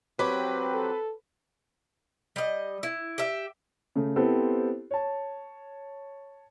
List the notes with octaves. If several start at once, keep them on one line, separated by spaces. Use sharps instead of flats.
F#3 C4 G4 B4 B5
A4
G3 D#5
E4
G4 E5
C#3 A3
B3 C4 E4 G4 A4 C5
C#5 A5